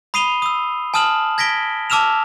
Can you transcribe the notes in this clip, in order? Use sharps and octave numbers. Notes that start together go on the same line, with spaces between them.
B5 D#6 C7 D#7 F7 G7
D#6 E6
G#5 A5 D#6 F6 E7 F#7
G#6 A#6 B6 D7 G7
A5 D6 E6 F6 E7 F7